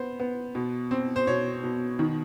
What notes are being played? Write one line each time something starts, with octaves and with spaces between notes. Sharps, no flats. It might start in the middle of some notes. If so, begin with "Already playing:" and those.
Already playing: B3 C5
B3
B2
C4
C5
B2 C#5
B2
D#3